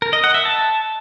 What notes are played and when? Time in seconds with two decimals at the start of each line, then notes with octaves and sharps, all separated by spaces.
0.02 A#4
0.13 D#5
0.24 F#5
0.34 E5
0.45 A5